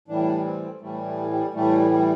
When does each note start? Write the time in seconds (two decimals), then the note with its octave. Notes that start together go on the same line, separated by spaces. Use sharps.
0.08 A2 E3 G3 D4
0.44 C4
0.81 A2 E3 G3 A3
1.05 A3
1.30 G3
1.53 A2 E3 G3 A3
1.90 G3